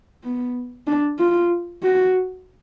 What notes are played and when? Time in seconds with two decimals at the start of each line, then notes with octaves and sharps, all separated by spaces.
0.23 B3
0.87 D4
1.18 F4
1.83 F#4